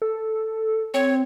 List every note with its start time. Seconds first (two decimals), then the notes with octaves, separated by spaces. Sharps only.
0.02 A4
0.94 C4 C#5